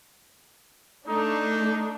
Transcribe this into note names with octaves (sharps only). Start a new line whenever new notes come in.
A3 D4 D#4